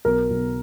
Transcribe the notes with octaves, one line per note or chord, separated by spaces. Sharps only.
B1 A#4
B1